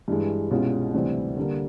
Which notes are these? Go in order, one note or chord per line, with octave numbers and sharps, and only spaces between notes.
G2 E3 G#3
C2 B2 G#3 C#4 F4
D2 C3 E3 G3 C4
D3 G3 A#3